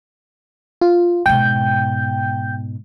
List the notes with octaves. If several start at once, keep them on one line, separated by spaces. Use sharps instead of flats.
F4
G#2 B2 G5 G6